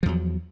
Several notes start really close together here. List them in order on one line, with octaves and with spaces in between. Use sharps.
F3 E2 F#3